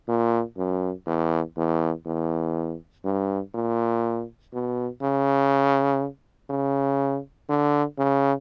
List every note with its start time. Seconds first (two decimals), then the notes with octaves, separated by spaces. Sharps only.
0.08 A#2
0.57 F#2
1.06 E2
1.57 E2
2.06 E2
3.05 G2
3.54 A#2
4.53 B2
5.02 C#3
6.50 C#3
7.49 D3
7.98 C#3